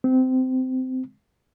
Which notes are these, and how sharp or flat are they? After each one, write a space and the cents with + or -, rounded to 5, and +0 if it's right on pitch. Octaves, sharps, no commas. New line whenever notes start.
C4 -20